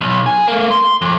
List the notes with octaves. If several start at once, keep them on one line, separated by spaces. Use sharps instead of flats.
B1
G#4
A3 A#3
C6
F2